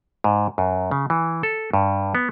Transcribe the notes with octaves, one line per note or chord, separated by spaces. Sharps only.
G#2
F#2
C#3
E3
A4
G2
B3